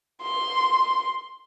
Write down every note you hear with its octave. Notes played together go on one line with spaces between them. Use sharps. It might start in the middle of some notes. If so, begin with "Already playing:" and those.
C6